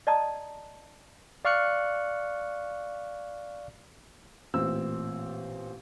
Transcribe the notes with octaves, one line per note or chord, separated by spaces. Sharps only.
D5 D#5 A5 A#5 D#6
D5 F5 C#6 F6 F#6 C#7
A1 A#2 C4 E6